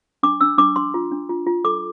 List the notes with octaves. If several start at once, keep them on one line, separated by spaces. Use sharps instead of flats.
D4 D6
D4 E6
D4 D6
D4 C6
F4
D4
F4
F4
A4 D6